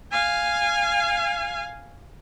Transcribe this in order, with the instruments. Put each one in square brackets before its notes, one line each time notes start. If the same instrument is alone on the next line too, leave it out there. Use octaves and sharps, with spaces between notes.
[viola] F5 G#5